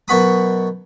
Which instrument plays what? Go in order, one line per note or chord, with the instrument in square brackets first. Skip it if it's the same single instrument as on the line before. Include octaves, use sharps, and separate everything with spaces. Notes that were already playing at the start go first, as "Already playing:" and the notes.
[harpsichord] F#2 B2 F#4 B5 D#6